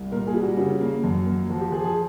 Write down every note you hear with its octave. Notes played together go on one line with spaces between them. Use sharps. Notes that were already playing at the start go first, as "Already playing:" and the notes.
Already playing: C2
A#2 A#4
G#4
G3
F#4
C#3
A#3
F#2
A#3
F3 F#4
G4
F3 G#4
G#4